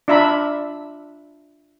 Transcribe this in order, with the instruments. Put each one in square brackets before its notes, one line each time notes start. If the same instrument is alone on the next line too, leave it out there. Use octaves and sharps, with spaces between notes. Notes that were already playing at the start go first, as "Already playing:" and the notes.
[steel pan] D4 F4 E5 A#5 B5